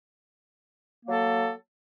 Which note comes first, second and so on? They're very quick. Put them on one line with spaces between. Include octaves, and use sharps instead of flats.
A#3 F#3 A4